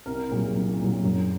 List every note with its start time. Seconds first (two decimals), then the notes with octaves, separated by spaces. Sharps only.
0.06 C2 A#4
0.21 A#4
0.30 A#2 F#3 G#4
0.55 C2
0.80 A#2 F#3
1.04 F#2